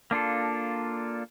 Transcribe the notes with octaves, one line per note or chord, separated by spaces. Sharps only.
A#3 D4 F4 A4